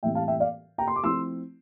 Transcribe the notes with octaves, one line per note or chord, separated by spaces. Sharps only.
A2 E3 G3 C4 E5 G5
F5 A5
E5 G5
D5 F5
G5 A#5
C6
D6
F3 A3 C4 E4 C6 E6